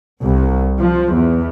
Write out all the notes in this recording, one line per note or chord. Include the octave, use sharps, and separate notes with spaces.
C2
F3
E2